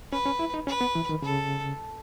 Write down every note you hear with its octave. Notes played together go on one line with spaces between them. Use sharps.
C#4 B4
C#4
E4
D#4
C#4 B4
B3
E3
D#3
C#3 A4